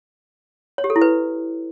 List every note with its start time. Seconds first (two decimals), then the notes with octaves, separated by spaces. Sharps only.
0.78 C#5
0.84 G4
0.90 A4
0.96 E4
1.02 B4